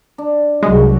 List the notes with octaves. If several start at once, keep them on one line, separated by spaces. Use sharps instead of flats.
D4
C2 F#3 G#3